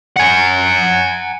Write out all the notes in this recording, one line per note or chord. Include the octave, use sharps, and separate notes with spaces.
F#5 G#5